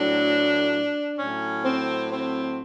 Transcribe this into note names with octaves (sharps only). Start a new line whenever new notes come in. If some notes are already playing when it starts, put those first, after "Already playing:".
Already playing: A2 F#3 D4
A2 F#3 C#4
C4
C4